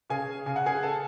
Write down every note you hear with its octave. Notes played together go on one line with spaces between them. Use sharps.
C#3 G#4 G#5
C#3 G#5
F#5
G#4 G#5
A4 A5